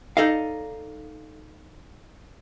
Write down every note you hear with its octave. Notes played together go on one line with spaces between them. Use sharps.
D#4 E4 A4 D5 D#5 F5